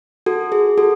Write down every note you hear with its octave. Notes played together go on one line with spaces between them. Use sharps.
F#4 A4
G#4
F#4 A4